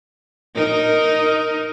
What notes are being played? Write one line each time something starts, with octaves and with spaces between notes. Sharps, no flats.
D#4 A#4